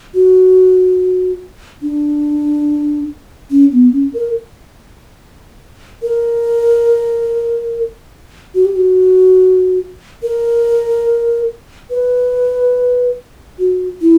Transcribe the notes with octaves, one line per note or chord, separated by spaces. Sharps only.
F#4
D4
C#4
B3
C#4
A#4
A#4
F#4
G4
F#4
A#4
B4
F#4
E4